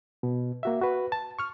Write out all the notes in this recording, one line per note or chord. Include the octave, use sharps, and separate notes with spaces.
B2
A#3 F#4 E5
F#4 B4
A5
C#6 F6